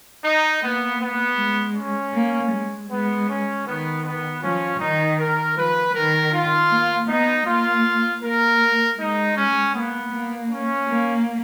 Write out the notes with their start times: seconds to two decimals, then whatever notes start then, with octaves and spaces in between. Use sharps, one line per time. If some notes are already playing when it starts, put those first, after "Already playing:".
0.24 D#4
0.62 A#3 B3
1.01 B3
1.38 G#3
1.76 C#4
2.14 A#3
2.52 G#3
2.90 G#3 B3
3.28 C#4
3.66 D#3 B3
4.04 B3
4.42 F3 C#4
4.80 D#3 D#4
5.18 A#4
5.56 F3 B4
5.94 D#3 A#4
6.32 F4
6.70 A#3
7.08 B3 D#4
7.45 A#3 F4
8.22 A#3 A#4
8.98 G#3 D#4
9.36 C#4
9.74 A#3 B3
10.12 A#3
10.50 C#4
10.88 A#3